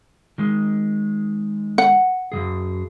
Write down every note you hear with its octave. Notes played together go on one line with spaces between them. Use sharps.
D#3 G#3
F#5
F#2 C#3 G#4